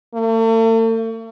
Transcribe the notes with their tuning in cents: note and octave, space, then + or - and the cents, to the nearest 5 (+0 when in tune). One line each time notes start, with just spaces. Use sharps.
A3 +45